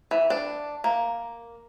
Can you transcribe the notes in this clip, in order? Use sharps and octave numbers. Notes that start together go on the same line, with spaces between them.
E3
D4
A#3